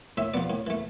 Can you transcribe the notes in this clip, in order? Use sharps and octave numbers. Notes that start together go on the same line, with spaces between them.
A2 E5
F3 B3 D5
A2
E3 A3